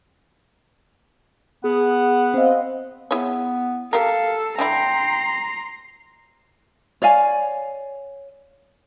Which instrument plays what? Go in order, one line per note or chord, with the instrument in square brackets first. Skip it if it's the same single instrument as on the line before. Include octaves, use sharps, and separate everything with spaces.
[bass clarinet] B3 [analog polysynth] G#4 [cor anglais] F#5
[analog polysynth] C4 D#5 [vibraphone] C5 F5
[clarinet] B3 [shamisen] E4 G#4 C#5
[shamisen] G4 A#4 [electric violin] A4 [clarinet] F5
[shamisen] D3 D4 E4 [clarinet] G5 [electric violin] A#5 C6
[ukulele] C#5 D5 F5 G#5